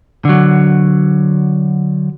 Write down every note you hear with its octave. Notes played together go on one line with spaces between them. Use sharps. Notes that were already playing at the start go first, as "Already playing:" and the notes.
D3 F#3